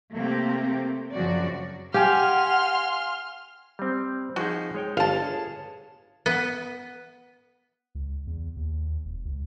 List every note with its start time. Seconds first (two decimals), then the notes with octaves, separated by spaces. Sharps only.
0.15 C3 A3 A#3 C4 G4
1.13 F#2 C#3 F3 F#3 F#4 D5
1.94 G4 F5 F#5 G#5 C6 F6
3.79 G3 C4
4.36 F3 D#4 F#4 G#4
4.74 G#3 C#5 G5
4.97 G1 F5 A5
5.23 G#4 C#5
6.26 B3
7.95 C#2
8.27 E2
8.57 D#2
9.05 E1
9.25 C#2